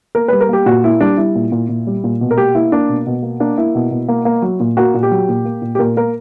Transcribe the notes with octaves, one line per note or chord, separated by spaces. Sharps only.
A#3 A#4
G3 B4
A#4
A#3 G4
A#2 F#4
A#3 E4
G3 D4
G3 E4
A#2
A#2
A#2
G3
A#2
B2
A#4
A#3 G4
A#3 E4
A#3 D4
B2
B2
A#3
A#3 D4
A#3 E4
B2
B2
A#3
A#3
F#3
A#2
A#3 F#4
A#2
G4
F#3
A#2
A#3
A#2
G4
A#2 A#4
A#3 A#4